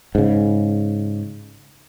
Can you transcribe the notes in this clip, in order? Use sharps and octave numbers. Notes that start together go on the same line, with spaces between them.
G#2 C#3